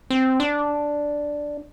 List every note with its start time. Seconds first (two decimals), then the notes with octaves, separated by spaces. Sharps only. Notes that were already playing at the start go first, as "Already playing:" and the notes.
0.10 C4
0.40 D4